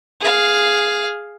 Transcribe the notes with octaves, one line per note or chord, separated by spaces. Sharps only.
G#4 F5